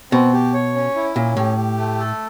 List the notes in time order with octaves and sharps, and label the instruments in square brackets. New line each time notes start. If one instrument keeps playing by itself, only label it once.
[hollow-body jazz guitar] B2 [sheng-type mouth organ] C4
[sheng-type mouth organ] G4
C#5
C#4
E4
[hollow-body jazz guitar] A#2 [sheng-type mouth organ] C#4
[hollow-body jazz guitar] A2 [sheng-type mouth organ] G4
[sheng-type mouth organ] G4
A3
A4